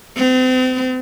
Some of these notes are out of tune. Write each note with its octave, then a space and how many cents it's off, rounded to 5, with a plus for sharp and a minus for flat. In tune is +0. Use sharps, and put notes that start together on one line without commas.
C4 -35